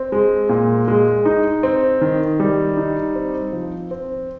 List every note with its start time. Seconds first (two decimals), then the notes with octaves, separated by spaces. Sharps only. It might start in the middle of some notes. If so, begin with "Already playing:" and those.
Already playing: C4
0.12 G#3
0.49 A#2
0.88 G#3
1.25 D#4
1.63 C4
2.02 D#3
2.40 G3
2.77 D#4
3.15 C4
3.52 F3
3.91 C4